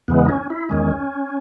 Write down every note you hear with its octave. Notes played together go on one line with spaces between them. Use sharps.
E2 C#3 E3 G#3 B3
D#4
C#4
E4
E2 D#3 G#3 C#4